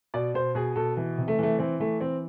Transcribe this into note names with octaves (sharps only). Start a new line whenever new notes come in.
B2 D5
B2 C5
B2 G#4
B2 A4
E3
C3
A3
E3 A3
E3 C4
E3 A3
E3 C4